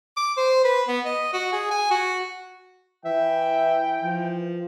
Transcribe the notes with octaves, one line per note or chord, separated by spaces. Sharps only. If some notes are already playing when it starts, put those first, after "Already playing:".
D6
C5
B4
B3
D#5
F#4
G#4
G#5
F#4
E3 E5 G5
F3